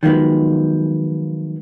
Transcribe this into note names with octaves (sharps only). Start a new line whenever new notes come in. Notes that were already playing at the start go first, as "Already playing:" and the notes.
D#3 F3 F#3 G#3 B3